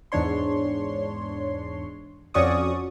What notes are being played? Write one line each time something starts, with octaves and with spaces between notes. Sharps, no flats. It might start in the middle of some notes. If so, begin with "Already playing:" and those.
E2 G#2 D4 C#5 C6
F2 C#4 F#4 D5 C#6 D#6